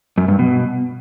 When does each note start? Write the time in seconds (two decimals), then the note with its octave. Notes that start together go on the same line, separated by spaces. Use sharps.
0.18 F#2
0.28 G2
0.39 B2